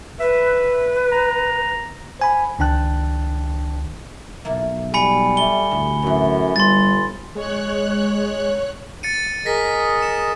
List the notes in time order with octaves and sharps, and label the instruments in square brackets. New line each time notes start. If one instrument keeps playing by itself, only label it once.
[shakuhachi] B4 [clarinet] E5
[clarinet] A#5
[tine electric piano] C5 G#5 B5
C#2 D#3 D4 G5 A5 F#6
[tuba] B1 [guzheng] A#3 E4 A4
[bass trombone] G3 [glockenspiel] G#5 B5 C#7
[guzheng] A3 [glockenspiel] G7
[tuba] D2 [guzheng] A2
[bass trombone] F#2 [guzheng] A2 E3
[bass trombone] G1 [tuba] G3 [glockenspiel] C6 A6
[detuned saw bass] G#3 [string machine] C#5 F#6
[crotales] A6 C#7 D#7
[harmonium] G#4 A#4 D#5 [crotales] A#6 B6
[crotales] C#7 E7